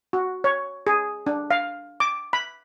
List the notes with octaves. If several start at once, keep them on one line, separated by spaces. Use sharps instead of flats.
F#4
C#5
G#4
D4
F5
D6
B5